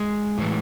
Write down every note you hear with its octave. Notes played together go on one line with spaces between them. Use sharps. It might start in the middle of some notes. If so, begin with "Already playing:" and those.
Already playing: G#3
A2 E3